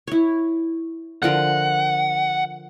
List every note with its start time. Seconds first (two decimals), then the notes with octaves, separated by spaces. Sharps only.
0.07 E4 C#5
1.22 D3 F3 A#4 F#5